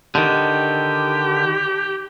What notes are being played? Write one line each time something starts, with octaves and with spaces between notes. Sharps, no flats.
D3 D#3 G4